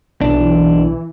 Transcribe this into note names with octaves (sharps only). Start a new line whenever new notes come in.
B1 E3 D4